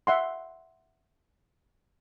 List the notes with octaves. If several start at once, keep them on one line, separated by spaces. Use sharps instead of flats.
E5 F#5 C6